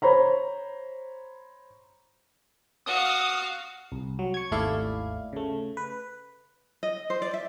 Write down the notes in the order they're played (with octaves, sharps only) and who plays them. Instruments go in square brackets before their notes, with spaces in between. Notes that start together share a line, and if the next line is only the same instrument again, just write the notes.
[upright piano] C5 C#5 A#5 B5
[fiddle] F#4 F5 [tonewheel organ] D#6
[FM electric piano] C2
F#3
C#6 G#6
G#1 D#2 A3 E4 D5 F5
C#3 A3
B4
[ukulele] D#5
C5
D5
E5